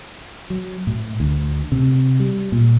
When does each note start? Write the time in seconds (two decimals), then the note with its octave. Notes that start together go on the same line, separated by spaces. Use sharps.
0.50 F#3
0.87 A2
1.20 D2
1.72 C3
2.20 G3
2.52 A#2